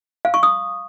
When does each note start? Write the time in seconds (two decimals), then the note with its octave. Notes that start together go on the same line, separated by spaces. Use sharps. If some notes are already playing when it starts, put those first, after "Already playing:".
0.25 F5
0.34 C#6
0.43 D#6